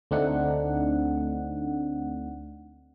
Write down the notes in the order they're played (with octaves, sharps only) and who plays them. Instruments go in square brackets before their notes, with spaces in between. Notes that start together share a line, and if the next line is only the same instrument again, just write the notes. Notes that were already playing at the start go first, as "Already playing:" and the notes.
[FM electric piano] D2 A3 C4 D4 D#4 F#5